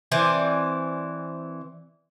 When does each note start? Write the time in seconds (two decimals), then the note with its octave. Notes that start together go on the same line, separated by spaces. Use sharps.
0.12 E3 C4 D5 G#5